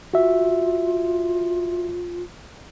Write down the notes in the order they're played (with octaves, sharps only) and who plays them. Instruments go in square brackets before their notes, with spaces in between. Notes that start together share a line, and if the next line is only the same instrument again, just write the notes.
[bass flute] F4 [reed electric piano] F#4 E5